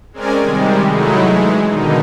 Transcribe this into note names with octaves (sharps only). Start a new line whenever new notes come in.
G#3 C4 C#4 A#4 D5 G#5
C3 D#3 G3 G#3
F#3 G#3 A3 D#4 E4
E3 G#3
B2 D3 D#3 D#4